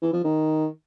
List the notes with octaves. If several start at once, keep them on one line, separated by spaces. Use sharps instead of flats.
E3
F3
D#3